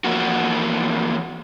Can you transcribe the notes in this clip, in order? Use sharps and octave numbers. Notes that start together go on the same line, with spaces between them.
E2 F3 A#3 F#4